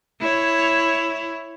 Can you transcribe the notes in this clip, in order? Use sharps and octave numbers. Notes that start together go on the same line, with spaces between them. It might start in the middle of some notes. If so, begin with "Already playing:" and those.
E4 C#5